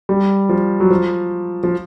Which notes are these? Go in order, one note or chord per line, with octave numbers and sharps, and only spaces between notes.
G3
F3
F#3
F3
F3